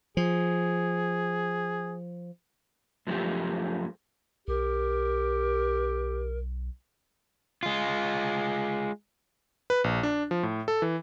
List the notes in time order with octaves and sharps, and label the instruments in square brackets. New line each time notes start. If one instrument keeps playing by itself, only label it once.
[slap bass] F3 [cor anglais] G#4
[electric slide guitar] F#2 F3 G#3 A3 G4
[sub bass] B1 [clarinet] G4 [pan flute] A#4
[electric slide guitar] G#3 F4
[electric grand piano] B4
A#1
D4
F3
A2
A4
E3